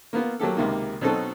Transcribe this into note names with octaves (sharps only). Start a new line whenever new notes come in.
A#3 B3 F4
F#3 A#3 G4 A4
C#2 C3 D#3 A#3
B2 F#3 C4 D#4 A4